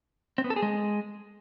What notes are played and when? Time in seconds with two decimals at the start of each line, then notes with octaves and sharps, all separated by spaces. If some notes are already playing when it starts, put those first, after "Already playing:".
0.38 C4
0.44 B3
0.50 A4
0.56 G#4
0.62 G#3